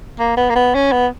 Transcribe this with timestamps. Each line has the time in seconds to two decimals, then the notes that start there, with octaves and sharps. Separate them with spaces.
0.19 A#3
0.37 B3
0.50 A#3
0.55 B3
0.75 C#4
0.92 B3